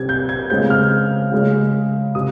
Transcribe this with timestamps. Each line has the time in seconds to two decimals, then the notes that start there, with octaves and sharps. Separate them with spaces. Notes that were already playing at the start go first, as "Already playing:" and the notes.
Already playing: C3 G3 C4 G#6
0.09 G6
0.29 G#6
0.50 C#3 G#3 C4 G6
0.70 F6
1.32 C#3 G#3 C#4
2.15 C3 D#6